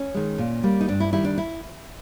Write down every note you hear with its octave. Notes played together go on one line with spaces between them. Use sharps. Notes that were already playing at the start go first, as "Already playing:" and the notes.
Already playing: C#4
D#3 G#3
A#2
G3 A#3
D#4
G2 D4
E4
D#3 G3 E4
D4
E4